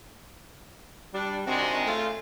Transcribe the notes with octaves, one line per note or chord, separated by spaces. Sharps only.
G3 D4
C3 D#3 G#3 C4 D4 F#4
C#3 A3 F4